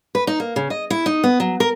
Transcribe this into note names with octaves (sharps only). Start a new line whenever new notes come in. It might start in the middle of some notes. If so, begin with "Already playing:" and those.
B4
D#4
A#3
C#3
D#5
E4
D#4
B3
F#3
A#4